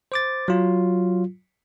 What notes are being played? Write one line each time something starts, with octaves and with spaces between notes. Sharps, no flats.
C5 D6 A6
F#3 F4